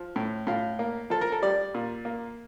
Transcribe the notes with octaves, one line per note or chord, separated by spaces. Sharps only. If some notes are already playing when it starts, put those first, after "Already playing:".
Already playing: F3
A2
A2 F4
A#3
F3 A4
A#4
A4
G3 D5
A#2
A#3